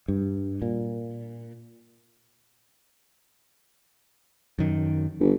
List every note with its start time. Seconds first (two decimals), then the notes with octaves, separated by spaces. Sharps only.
0.08 G2
0.62 A#2
4.59 F#2 D#3
5.20 G1